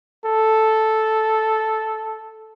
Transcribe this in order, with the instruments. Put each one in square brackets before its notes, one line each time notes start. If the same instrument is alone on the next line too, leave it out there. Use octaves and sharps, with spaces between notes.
[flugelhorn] A4